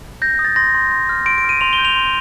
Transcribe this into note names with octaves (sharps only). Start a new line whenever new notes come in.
G6 A#6
D#6
A6
C6 A#6
C6
C6
F6
C6 D7
D7
F6 D#7
C6 F7
G7
G6
F7
C6